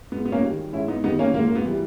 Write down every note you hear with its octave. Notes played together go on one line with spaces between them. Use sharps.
G#2 B3
B3
A#3 C#4
D#3 G3
G#2 C#4 E4
B3 D#4
D#3 G3 B3 D#4
A#3 C#4
G#2 A#3
A#3
B3
E3 G3